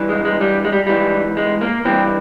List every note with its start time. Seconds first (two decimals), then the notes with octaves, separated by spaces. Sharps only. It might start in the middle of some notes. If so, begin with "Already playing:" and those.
Already playing: G2 E3
0.09 G#3
0.25 G#3
0.41 G3
0.65 G#3
0.72 G3
0.87 G#2 E3 G3
1.37 G#3
1.61 A#3
1.85 G2 E3 C4